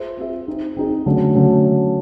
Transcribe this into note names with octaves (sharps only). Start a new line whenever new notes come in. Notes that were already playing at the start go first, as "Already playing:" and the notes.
Already playing: F4 G#4 C5 E5
C4 F4 G#4 C5 E5
C4 D#4 G#4
C4 D#4 G#4
D3 F#3 A3 C#4
D3 F#3 A3 C#4